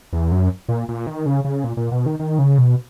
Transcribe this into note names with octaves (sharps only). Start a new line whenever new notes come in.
E2
F#2
A#2
A#2
D#3
C#3
C#3
A#2
A#2
B2
D#3
D#3
C#3
B2